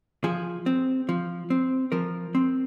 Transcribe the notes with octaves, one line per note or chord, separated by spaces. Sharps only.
F3 G#4
C4
F3
C4
F3 A#4
C4